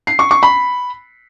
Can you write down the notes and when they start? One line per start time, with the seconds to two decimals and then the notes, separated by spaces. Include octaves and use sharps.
0.07 C7
0.19 C#6
0.31 C#6
0.43 B5